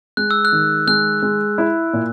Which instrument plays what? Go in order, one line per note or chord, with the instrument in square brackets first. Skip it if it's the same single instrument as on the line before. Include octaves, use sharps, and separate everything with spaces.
[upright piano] G#3 [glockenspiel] F#6
[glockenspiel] E6
F#6
[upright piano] D#3
[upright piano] G#3 [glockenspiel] F#6
[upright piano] G#3
E4
A#2